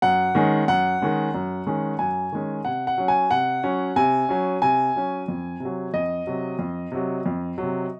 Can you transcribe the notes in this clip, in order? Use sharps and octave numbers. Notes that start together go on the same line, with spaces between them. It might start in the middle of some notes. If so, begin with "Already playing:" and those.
F#2 F#5
D#3 G#3 C#4
F#2 F#5
D#3 G#3 C#4
F#2
D#3 G#3 C#4
F#2 G#5
D#3 G#3 C#4
C3 F#5
F#5
F#3 C#4
G#5
C3 F#5
F#3 C#4
C3 G#5
F#3 C#4
C3 G#5
F#3 C#4
F2
C3 F#3
F2 D#5
C3 F#3
F2
C3 F#3
F2
C3 F#3